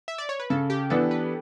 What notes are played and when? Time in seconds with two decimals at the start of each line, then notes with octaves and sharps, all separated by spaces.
0.08 E5
0.18 D5
0.29 C#5
0.40 B4
0.50 C#3 A4
0.70 G4
0.90 E3 B3 D4 A4
1.11 B4